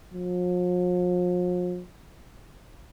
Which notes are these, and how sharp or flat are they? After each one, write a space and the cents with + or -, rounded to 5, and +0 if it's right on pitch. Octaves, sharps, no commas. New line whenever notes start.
F3 +40